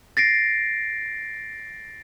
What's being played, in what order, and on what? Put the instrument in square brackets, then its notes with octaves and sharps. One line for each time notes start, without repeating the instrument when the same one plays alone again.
[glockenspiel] A6 A#6 C7 D7